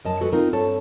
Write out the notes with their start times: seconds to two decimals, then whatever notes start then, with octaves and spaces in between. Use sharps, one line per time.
0.05 F#2 D#5 A5
0.20 G#3 F#4 A4 B4
0.33 C4 D#4 F4 A#4
0.53 G2 C4 A4 C#5 A5